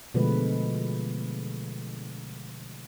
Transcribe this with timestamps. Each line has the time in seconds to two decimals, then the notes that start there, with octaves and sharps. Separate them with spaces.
0.14 B2 D3 F3 G#3 A3 B4